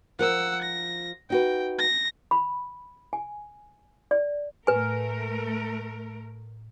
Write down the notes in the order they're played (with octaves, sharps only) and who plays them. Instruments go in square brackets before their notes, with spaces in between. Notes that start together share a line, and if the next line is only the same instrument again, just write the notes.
[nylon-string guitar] F3 A#4 [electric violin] F#5 E6
[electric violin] A#6
[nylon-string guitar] D#4 F#4 B4 [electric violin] G5
[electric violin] A#6
[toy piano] B5
G#5
D5
[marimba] A2 F6 [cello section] A3 A#4 [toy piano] B4 G#5